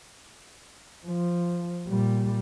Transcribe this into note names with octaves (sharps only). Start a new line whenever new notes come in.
F3
A#2 G3